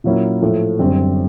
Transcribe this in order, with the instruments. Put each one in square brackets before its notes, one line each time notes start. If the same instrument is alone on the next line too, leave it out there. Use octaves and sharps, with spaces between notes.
[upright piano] A#2 F#3 A#3 C#4 E4
A2 F3 A3
F#1 F#2 D3 G3 C4